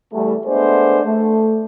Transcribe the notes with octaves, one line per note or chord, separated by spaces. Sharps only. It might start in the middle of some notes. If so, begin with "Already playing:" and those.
E2 G3 A3
G#3 A3 B3 D4 C5 D5
A3